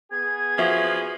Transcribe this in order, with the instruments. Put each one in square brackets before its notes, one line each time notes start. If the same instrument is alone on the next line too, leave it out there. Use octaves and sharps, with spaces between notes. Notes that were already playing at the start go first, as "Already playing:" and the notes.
[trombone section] B3 G#4 [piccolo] G#6
[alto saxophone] F3 [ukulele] F#4 E5